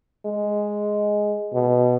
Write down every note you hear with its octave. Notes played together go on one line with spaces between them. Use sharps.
G#3
B2